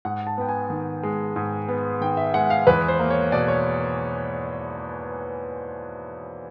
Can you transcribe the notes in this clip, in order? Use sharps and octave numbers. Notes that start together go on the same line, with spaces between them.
G#2 F#5
A5
B3 G5
G#5
D#3
G#3
G#2
B3
D#3 G5
E5
G#3 F#5
F5
E2 B4
C5
A#3
C#5
B2 D5
C#5